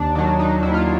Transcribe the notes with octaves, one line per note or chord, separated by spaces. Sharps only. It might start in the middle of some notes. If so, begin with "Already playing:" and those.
Already playing: D#2 D4
D#3 F#3 D4
D#4
D#2 E4
F4